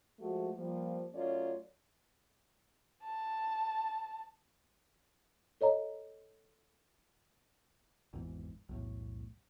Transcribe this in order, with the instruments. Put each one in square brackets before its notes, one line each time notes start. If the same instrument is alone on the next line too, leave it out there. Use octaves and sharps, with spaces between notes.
[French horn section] F3 G#3 A3 F#4
F3 G3 A#3
F#2 A3 C#4 F4 C#5 D5
[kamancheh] A5
[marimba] A4 C#5 D#5 A#5
[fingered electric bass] G#1 E2 G#2 E3
B1 E2 A2